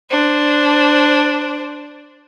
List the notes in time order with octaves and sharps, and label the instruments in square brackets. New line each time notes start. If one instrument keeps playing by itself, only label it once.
[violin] D4 C5